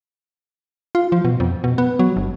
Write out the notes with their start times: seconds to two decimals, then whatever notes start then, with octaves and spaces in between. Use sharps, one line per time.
0.95 F4
1.12 F3
1.25 B2
1.40 F2
1.64 B2
1.78 B3
1.99 F#3
2.17 G1